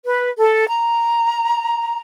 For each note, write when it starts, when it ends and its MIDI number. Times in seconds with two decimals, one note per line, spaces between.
0.04 0.28 71
0.38 0.65 69
0.67 2.00 82